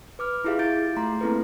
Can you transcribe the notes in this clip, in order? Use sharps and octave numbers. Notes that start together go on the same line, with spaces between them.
B4 D6 F6
E4 F4 G4 G#4 E5 F5
E4 G6 A6 D7
A3 A#5 C6
A#3 C4 E4 A4 B4